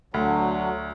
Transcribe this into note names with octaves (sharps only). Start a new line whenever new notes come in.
D2 D3 F#3